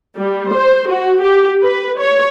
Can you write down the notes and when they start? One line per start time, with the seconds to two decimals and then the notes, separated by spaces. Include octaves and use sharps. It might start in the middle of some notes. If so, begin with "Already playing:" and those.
0.16 G3
0.53 C5
0.89 F#4
1.22 G4
1.63 B4
1.98 C#5